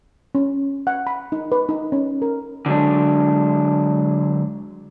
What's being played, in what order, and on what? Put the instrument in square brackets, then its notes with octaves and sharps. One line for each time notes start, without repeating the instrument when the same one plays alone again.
[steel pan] C#4
F#5
B5
D#4
B4
D#4
C#4
A#4
[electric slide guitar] D3 F#3 G#3 D4